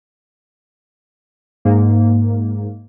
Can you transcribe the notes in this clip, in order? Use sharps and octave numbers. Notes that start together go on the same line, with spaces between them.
G#2 A#3